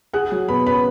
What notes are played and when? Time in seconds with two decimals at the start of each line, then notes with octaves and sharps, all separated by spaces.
0.13 G#4 F#5 F#6
0.32 F#3
0.49 B2 B4 B5
0.67 C#4 B4 B5